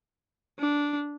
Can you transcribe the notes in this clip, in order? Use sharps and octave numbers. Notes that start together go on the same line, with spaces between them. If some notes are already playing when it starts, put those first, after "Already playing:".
D4